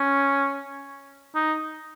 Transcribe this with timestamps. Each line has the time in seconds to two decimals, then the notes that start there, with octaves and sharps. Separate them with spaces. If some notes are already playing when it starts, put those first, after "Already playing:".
Already playing: C#4
1.35 D#4